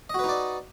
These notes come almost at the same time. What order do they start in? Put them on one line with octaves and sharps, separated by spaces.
D#5 F#4 B4 D#4 D5